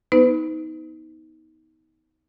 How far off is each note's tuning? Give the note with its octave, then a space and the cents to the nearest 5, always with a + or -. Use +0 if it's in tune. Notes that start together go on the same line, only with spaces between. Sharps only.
B3 +0 D#4 +25 B4 +40